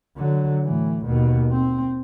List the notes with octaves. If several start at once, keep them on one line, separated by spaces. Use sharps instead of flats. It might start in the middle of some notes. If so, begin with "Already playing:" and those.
D3 F#3
A2 E3
D#2 B2
C4